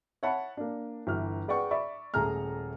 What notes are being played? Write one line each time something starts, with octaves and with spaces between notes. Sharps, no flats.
C#5 E5 F#5 A5 B5
A#3 D4
G1 E3 F6
G#4 B4 D5 F#5 G5 C#6
D5 E5 B5 C#6
D#1 A3 G#4 A4 A#5 F6